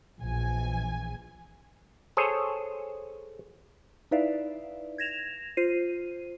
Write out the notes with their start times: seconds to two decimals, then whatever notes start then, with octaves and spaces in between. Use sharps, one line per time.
0.20 A#1 E3 G#5
2.17 G#4 A4 C5 C#5
4.11 D#4 E4 B4 D5 E5 F5
4.98 G#6 A#6 E7 F7
5.57 F4 C5 C7 D#7